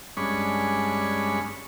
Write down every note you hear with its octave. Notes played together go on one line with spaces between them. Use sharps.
G2 G#3 C#4 D4 B5 C#6